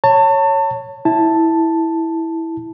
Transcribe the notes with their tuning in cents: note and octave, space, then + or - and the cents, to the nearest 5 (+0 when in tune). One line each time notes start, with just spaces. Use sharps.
C#5 +0 A5 +30
E4 -10 A5 +0